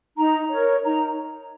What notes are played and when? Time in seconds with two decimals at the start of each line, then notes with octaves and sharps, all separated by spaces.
0.17 D#4 A#5
0.50 A#4 C#5
0.84 D#4 A#5